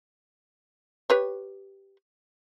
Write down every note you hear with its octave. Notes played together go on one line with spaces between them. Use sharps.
G4 B4 C#5